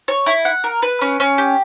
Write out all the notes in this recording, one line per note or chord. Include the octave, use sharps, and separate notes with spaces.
C#5
E4
F#5
A#4
B4
C#4
C#4
G4